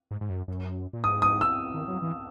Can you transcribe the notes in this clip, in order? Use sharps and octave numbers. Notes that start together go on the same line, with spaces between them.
G#2
G#2
F#2
F#2
A#2
G#2 D#6
D#6
E6
D#3
F#3
E3